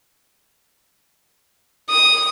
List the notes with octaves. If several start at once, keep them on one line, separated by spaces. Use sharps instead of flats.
D#6